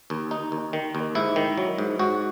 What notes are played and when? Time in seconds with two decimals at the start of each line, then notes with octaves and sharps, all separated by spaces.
0.10 D#2
0.31 D#4
0.52 D#2
0.73 D#3
0.95 D#2
1.15 G#2 E4
1.36 D#3
1.57 F#3
1.78 G#2
1.99 G#2 F#4